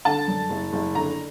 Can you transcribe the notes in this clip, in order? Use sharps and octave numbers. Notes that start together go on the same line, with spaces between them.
D3 A5
F#2
F#1
F#1
D3 A#5